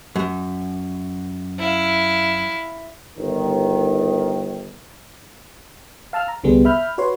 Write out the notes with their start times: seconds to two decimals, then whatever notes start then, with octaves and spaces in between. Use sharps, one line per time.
0.16 F#2
1.59 E4 F5
3.16 G1 D#3
6.13 F5 A5 E6 F6
6.28 A#5
6.44 C2 D3 G3 B3 G#4
6.65 E5 B5 F6 G6
6.98 F#4 B4 C#5 C6